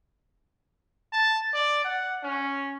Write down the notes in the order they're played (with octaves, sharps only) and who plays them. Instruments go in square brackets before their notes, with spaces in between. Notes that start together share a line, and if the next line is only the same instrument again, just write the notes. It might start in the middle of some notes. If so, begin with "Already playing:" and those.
[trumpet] A5
D5
F#5
C#4